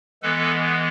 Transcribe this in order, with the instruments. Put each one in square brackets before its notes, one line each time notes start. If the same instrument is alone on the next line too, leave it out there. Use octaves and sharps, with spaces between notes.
[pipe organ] E3 G#3 B3 A4 B4